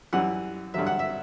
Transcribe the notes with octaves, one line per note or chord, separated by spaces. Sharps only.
F#2 E3 G3 F#5
G2 D3 F#3 E5
F#5
E5